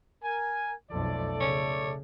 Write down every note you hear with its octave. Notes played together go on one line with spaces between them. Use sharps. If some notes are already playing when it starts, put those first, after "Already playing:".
A#4 G#5
B1 F2 A3 A4 D5
C#3 C#5